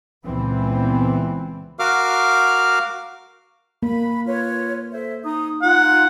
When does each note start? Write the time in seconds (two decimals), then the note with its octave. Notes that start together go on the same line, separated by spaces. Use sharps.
0.25 C#2 A#2 E3 B3 C4
1.79 F#4 A#4 F5 D6 F6
3.83 A#3 B5
4.26 F4 B4 C#5
4.92 A4 C5 E5
5.24 D#4 D#6
5.62 D#4 F4 F#5